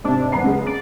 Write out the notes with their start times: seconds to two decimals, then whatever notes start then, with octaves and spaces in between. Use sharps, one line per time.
0.04 G#2 C3 D4
0.32 F#1 B3 A#5 C7
0.44 C#3 G#3
0.66 D5